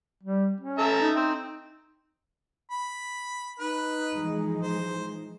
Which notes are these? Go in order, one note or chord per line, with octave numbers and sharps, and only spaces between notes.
G3
C#4
A4 E5 A#5
D#4
C4
B5
D#4 B4
E3 F3 G#3
C5